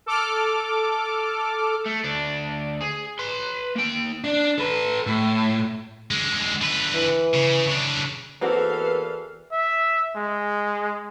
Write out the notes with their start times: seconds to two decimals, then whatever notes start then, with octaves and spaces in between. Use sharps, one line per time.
0.06 A4 D6 F6
1.86 A3
2.04 D2 D4
2.81 G#4
3.19 B4 C6
3.76 A#3 G5
4.24 D4
4.58 A4 B4
5.07 A2
6.11 D3 G#3
6.61 D3 B4
6.95 E3
7.34 C#3
7.67 C#3 D4
8.41 E2 E3 A#3 C4 F#4 A4 F5
9.52 E5
10.16 G#3